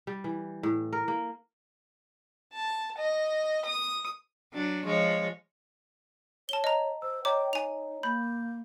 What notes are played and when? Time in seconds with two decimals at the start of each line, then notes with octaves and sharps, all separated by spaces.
0.07 G3
0.24 E3
0.63 A2
0.93 A#4
1.08 A#3
2.53 A5
2.97 D#5
3.65 D#6
4.53 F#3 D4
4.85 F3 G#3 C#5
6.49 C#5 A5 G7
6.64 D#5 A#5
7.02 C5 E6
7.25 C#5 D#5 G5 A#5 D6
7.53 D#4 G#5 F7
8.03 A#3 B5 G6